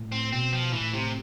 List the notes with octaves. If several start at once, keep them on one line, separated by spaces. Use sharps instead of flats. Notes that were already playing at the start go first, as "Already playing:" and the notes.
Already playing: A2
C4
B2 C4
F3
A2 E3
C3